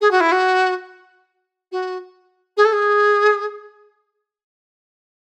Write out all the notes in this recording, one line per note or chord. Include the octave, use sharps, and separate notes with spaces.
G#4
F#4
E4
F#4
F#4
G#4
A4
G#4